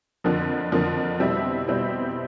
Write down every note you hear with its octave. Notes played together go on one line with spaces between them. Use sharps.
F2 D3 F3 A#3
F2 D3 F3 A#3
B2 G3 C4 E4
B2 G3 C4 E4